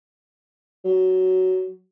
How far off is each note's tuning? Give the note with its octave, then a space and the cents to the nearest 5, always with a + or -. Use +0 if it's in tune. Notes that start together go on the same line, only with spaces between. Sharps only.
F#3 +10